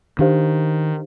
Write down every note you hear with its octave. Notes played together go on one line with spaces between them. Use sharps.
D#3 D4 G4 C5 F5